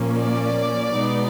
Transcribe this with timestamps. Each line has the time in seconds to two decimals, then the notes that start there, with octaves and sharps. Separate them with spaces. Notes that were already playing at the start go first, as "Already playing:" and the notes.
Already playing: A#2 F3 A#3 C#4
0.18 D5
0.97 B2 G#3 B3 D#4